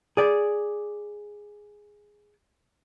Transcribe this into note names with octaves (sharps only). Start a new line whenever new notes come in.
G#4 D5